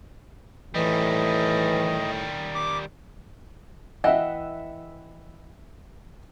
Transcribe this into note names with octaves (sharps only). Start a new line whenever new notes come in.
A2 D#3 E3 G3 D#5
D6
E3 D#5 E5 F#5 G5